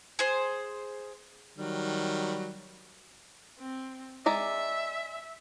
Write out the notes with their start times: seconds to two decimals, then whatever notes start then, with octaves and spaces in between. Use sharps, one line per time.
0.19 G#4 C5
1.58 D#3 F#3 G3
3.59 C4
4.26 G#3 D5 E5 A#5